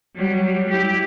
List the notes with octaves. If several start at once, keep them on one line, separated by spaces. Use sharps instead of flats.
F#3 G3
E4 G4